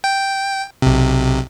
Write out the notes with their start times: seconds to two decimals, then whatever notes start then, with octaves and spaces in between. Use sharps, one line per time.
0.04 G5
0.82 B1 C3